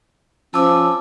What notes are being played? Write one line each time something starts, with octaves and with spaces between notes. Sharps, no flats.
F3 C#4 A5 D6 E6